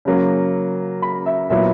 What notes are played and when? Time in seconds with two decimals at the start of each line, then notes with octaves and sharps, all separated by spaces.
0.05 C#3 F#3 A#3
1.02 B5
1.26 E5
1.50 A#2 F#3 B3 E4 E5